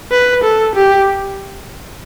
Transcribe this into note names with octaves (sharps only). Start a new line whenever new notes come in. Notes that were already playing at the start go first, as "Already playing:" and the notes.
B4
A4
G4